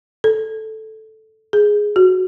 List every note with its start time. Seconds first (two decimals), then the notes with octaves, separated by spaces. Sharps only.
0.24 A4
1.53 G#4
1.96 F#4